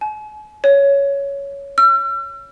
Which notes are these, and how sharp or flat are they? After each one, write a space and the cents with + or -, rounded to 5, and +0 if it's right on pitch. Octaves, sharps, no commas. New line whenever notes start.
G#5 +45
C#5 +10
E6 +45